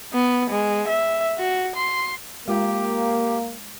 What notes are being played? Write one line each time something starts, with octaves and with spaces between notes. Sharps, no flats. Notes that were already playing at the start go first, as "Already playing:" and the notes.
B3
G#3
E5
F#4
C6
G#3 A#3 F4 G4